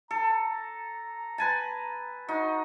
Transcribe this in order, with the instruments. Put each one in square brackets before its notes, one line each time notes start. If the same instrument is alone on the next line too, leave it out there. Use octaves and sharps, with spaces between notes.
[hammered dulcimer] A4 [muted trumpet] A#5
[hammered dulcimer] B4 G#5 A5
[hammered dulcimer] D#4 [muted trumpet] F#4